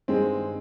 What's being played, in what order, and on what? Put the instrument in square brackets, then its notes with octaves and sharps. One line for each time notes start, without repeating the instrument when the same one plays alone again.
[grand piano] G2 D#3 G3 [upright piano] G#3 C4